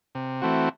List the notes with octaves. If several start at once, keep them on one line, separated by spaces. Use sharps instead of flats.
C3
E3 A3 C4 F#4